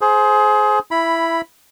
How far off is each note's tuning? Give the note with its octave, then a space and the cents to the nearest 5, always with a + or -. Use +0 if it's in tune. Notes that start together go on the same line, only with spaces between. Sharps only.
G#4 +25 C5 +0
E4 +10 B5 +0